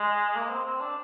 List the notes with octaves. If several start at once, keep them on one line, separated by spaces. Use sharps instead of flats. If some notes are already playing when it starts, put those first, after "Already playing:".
Already playing: G#3
A#3
C4
C4
D4